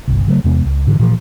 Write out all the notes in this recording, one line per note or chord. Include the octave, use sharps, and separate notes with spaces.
G1 C2
C#3 F#3 A3
E2 C3 G#3 B3
C#2
G#2 D3 E3
A#2 E3 F3